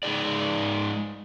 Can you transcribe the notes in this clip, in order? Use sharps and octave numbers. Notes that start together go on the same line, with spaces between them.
G#3 D#4 G#4 D5